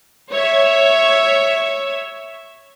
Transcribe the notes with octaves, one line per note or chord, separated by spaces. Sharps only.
C#5 E5